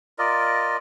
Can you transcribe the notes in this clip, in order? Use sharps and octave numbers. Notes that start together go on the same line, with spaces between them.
F4 A#4 D5 D#5